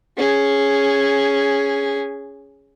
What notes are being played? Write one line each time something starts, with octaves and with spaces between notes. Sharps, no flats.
C#4 G#4